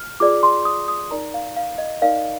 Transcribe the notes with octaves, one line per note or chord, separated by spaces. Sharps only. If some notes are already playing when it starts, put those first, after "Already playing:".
Already playing: F6
F4 G#4 D5 D6
C6
D#6
D#6
D#4 A#4 D5 A#5
F5
F5
D#5
D#4 A#4 D5 F5